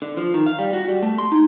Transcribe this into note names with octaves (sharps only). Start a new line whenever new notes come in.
D3
F3
D#3
F5
G3
F#4
G3
A3
C6
D#4